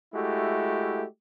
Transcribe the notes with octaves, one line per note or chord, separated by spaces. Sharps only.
G#3 A3 E4 F#4 G4